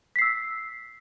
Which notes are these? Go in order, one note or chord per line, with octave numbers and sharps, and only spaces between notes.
E6 B6 C7